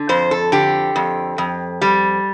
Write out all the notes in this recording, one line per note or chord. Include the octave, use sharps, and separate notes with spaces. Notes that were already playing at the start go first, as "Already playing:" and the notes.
Already playing: D3
F2 C5
A4
D3 G4
F2
F2
G3